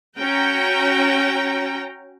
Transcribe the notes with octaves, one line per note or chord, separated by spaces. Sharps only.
C#4 F#4 G5 A#5